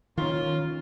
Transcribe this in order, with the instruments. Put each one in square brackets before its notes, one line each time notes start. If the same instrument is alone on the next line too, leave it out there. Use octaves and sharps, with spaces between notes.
[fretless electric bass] D#3 C#4 [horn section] A#3 F4